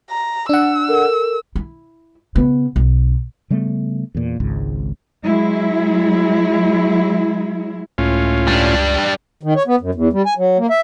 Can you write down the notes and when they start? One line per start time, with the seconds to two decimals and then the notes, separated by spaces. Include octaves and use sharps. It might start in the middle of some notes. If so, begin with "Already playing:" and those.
0.10 A#5
0.49 D4 F#5 E6
0.88 A4 A#4
1.55 E4
2.36 C#3 B3
2.76 B1
3.50 C#3 G3 A3 B3
4.15 E2 A#2
4.40 G#1 C#2 G#2
5.24 F#3 G#3 E4
7.98 C#2 A2 C#4 F4
8.48 G3 D4
9.43 D#3
9.56 C#5
9.67 B3
9.80 F#2
9.95 E2
10.13 G3
10.26 G#5
10.38 F#3
10.58 A#3
10.70 E5